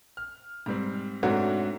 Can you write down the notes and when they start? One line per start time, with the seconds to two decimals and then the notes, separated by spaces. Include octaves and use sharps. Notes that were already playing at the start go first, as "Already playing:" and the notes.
0.17 F6
0.66 G#2 G3 C4
1.23 G#2 F#3 A3 C4 D4 F#4